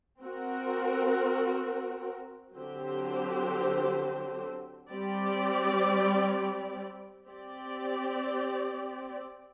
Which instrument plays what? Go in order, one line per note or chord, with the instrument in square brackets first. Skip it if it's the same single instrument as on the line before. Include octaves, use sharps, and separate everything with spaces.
[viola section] C4 F#4 A#4
D3 F#3 C4 G4 C5
G3 C4 G4 D5
C4 G4 D5